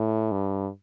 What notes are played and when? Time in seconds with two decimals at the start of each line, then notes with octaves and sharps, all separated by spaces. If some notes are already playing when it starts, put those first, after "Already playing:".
Already playing: A2
0.32 G2